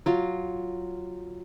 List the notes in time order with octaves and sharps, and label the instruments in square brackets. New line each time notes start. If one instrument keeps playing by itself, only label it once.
[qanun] F#3 F4